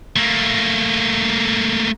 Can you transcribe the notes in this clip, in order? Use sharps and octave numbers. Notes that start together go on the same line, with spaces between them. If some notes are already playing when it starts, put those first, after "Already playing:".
A3 A#3